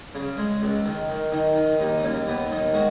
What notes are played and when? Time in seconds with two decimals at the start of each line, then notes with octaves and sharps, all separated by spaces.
0.15 C#3
0.38 G#3
0.62 C#2
0.86 D#3
1.09 D#3
1.32 D#3 D#4
1.56 D#3
1.80 D#2 D#4
1.98 D#4
2.03 D#2 C#4
2.27 D#2 B3
2.50 D#3 D#4
2.74 G#3 F#4